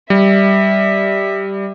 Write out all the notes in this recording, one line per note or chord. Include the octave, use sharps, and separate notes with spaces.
G3 E5